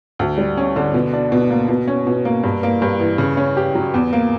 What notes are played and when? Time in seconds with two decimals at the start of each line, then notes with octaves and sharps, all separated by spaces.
0.19 D2
0.38 G3
0.57 C#4
0.76 D3
0.94 B2
1.13 D4
1.32 B2
1.50 A#3
1.69 B2
1.88 C#4
2.07 B2
2.25 A#3
2.44 G2
2.63 A#3
2.82 G2
3.00 E3
3.18 C#3
3.37 C#4
3.57 G4
3.75 F#3
3.94 E2
4.13 A#3